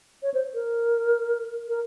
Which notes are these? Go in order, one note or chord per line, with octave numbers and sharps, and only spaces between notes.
C#5
C5
A#4
A#4